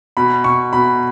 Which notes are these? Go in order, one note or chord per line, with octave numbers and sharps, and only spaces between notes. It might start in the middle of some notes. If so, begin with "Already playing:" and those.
B2 B5
B2 C#6
B2 B5